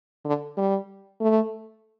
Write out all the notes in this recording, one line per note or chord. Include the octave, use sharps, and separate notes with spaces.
D3
G3
A3